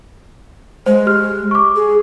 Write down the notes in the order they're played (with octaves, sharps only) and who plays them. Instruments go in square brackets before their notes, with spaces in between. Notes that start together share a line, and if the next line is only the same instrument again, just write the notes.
[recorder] G#3 [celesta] C5
[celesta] G4 F6
C#6 D6
[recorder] G#4